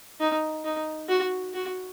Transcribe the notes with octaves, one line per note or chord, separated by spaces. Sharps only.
D#4
D#4
F#4
F#4